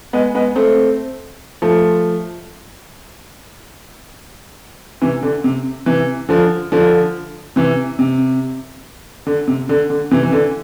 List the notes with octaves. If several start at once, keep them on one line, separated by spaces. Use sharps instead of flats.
G#3 B3
G#3 B3
A3 C4
F3 A3
C3 E3
D3
C3
C3 E3
D3 F3
D3 F3
C3 E3
C3
D3
C3
D3
D3
C3 E3
E3
D3